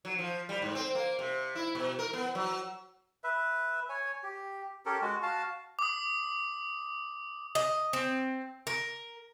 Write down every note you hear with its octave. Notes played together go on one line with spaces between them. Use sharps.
F#3
F3
G3
G#2
C4
A#3
C3
E4
B2
A#4
B3
F#3
B4 E5
C#5 G#5
G4
C#4 G4 A4 A#4
G#3 F#4
F#4 F5 A5
D6 D#6
D#5
C4
A#4